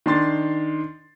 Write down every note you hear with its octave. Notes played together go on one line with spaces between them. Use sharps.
D#3 D4 C6 A6